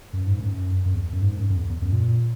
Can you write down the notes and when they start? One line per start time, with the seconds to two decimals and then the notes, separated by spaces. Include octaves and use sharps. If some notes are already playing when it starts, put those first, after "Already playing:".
0.13 F#2
0.27 G#2
0.39 F#2
0.85 F#2
0.94 E2
1.13 F#2
1.22 G#2
1.39 F#2
1.50 F#2
1.57 E2
1.70 E2
1.81 F#2
1.92 A#2